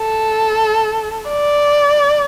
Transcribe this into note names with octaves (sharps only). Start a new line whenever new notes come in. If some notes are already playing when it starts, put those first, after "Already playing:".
Already playing: A4
D5